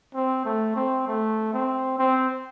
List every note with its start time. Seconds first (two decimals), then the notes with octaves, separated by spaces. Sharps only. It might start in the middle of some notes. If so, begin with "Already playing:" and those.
0.15 C4
0.45 A3
0.76 C4
1.07 A3
1.53 C4
1.99 C4